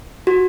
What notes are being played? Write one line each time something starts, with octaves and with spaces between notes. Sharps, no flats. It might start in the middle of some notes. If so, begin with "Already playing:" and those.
F#4